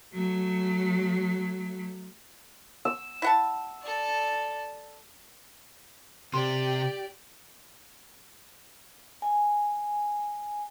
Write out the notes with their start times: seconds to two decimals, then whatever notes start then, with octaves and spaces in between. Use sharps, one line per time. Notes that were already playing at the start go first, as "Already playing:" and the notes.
0.14 F#3 A3
2.85 E6
3.22 E4 F#5 A5
3.82 A4 D5
6.34 C3 G4 D5 C6
9.22 G#5